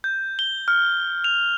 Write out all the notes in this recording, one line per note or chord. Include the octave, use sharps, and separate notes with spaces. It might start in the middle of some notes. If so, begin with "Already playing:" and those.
G6
G7
F6
F7